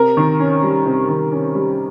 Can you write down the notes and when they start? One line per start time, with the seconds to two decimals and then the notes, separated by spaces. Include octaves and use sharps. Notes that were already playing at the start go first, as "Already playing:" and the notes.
Already playing: C3 A#4
0.17 D#3
0.40 C#4
0.63 G3
0.86 C3
1.08 D#3
1.32 C#4
1.54 G3